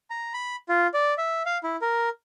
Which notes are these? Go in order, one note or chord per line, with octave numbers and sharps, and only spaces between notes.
A#5
B5
F4
D5
E5
F5
E4
A#4